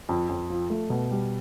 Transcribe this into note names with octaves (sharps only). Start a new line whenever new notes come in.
F2
F2
F3
A3
B2
G3